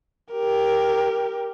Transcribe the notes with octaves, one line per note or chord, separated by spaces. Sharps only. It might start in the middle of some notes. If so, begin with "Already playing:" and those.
G4 A#4